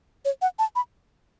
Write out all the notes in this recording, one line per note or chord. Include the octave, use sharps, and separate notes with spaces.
C#5
F#5
A5
B5